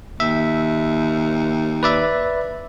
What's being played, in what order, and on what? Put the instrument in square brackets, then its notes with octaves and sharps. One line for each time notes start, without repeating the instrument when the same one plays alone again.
[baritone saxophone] D#2 [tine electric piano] E5
[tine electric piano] B4 D5 E5